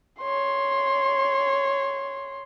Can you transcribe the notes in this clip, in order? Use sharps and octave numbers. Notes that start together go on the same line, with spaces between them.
C#5 C6